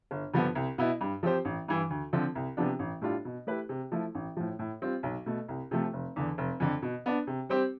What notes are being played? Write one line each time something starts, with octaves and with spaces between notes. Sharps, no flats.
G1
G2 D3 F3 B3
C2
B2 B3 E4
G2
F3 C4 G4 C5
A1
G2 E3
D2
D3 F3 C4
C2
C3 F3 B3 D4
A1
A2 G3 D4 F4
B2
A3 E4 G4 B4
C3
F3 A3 E4
A1
A2 F3
A2
G3 C4 F4
B1
B2 A3
C2
C3 F3 A3
F1
E2 D3
F1
F2 D3
B2
B3 D4
C3
G3 C4 G4 C5